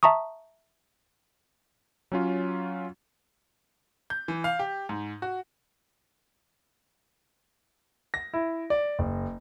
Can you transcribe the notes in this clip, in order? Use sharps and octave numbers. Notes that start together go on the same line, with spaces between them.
E5 A5 A#5 C#6 D#6
F#3 C#4 F4
G6
E3
F5
G4
G#2
F#4
A#6
E4
D5
F#1